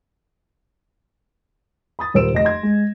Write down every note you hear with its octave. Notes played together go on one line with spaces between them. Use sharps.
B5 D#6 A6
D#1 A#4 C5 E6 D7 E7
F1 D#5 A#6
C6 G#6
G#3